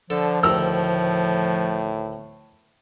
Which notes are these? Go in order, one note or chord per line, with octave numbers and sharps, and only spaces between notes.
D3 F3 A4
D2 A2 D#3 A#5 E6